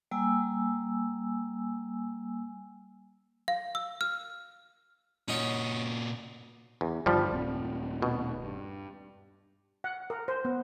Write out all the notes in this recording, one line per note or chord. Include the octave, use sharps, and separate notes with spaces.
G3 A#3 G#5 E6
F5
E6
F6
A#2 C#4 D#4 F#4 C#5
E2
G2 D3 D#3 F3 G3
D#1 C4
B2
G2
F#5
A#4
C5
B3